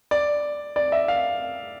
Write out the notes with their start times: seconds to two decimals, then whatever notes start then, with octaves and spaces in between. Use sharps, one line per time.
0.11 D5
0.76 D5
0.92 E5
1.08 F5